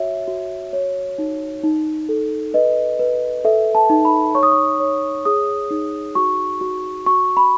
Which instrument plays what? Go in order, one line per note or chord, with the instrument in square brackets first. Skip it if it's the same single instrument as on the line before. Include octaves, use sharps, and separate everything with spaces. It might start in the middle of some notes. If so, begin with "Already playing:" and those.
Already playing: [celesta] F#4 C#5 E5
F#4
C#5
D#4
D#4
A4
B4 D#5
B4
A4 E5
A5
D#4
B5
C#5 C#6
D#6
C#6
C#5
G#4 D#6
D#4
F#4 C#6
F#4
F#4 C#6
B5